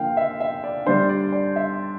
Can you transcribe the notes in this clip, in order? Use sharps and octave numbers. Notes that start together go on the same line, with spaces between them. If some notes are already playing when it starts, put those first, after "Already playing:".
Already playing: D3 F3 A#3 F5 G5
E5
E5
D5
D3 G3 D4 C5
D5
D5
E5